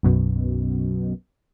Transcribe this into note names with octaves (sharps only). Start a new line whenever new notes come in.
B1 F#2 B2